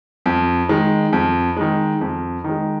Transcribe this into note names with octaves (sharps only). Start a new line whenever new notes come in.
F2
D#3 G#3
F2
D#3 G#3
F2
D#3 G#3